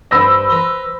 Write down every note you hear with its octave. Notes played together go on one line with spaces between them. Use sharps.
G2 C5 B5 E6 A#6
B4 A#5 C6